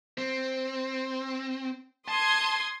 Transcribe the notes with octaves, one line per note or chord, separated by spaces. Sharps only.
C4
A5 C6 D#6 G#6